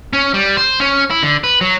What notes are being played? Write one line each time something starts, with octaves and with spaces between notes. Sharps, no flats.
C#4
G3
C5
C#4
E4
D3
B4
F#3